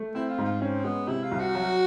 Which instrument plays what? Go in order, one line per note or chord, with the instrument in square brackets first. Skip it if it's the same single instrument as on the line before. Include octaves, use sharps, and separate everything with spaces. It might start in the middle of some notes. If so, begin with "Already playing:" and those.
Already playing: [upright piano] A3
[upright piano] C4 [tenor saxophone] E4
[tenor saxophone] F4
[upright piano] G#2
[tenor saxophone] F4
[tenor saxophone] C4 [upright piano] C#4
[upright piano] G#3 [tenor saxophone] B3
[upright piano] C3 [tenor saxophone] E4
[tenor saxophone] F4
[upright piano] C2
[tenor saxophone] F#4
[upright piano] F#3